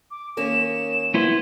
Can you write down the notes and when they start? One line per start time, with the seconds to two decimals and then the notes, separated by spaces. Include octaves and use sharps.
0.11 D6
0.37 D#3 A#3 C#4 E7
1.14 B3 E4 C5 G#6